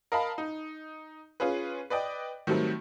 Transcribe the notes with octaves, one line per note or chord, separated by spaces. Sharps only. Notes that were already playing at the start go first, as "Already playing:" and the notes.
A#4 D#5 F5 A5 B5
D#4
C#4 F4 G#4 B4
B4 D5 D#5 G5
D#3 F#3 G3 A3 C4